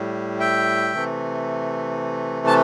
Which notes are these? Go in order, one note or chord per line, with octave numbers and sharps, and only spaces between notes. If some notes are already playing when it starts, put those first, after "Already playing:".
Already playing: A2 G3
E5 G5
C3 E3 A3
A5